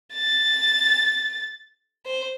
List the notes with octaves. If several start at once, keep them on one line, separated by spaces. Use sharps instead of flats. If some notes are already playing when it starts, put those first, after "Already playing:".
A6
C5